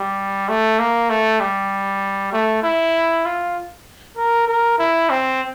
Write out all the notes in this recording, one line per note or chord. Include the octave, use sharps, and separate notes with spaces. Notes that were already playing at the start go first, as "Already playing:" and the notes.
Already playing: G3
A3
A#3
A3
G3
A3
E4
F4
A#4
A#4
E4
C4